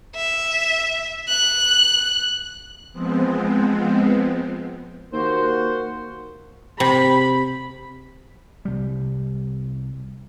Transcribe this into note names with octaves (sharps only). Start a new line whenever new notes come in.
E5
F#6
F3 G#3 B3 C4
D#2 A#3 F#4 C5
C3 B5
C2 G3